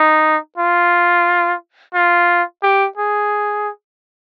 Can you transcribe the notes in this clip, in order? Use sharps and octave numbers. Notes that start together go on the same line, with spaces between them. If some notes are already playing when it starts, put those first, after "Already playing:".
Already playing: D#4
F4
F4
G4
G#4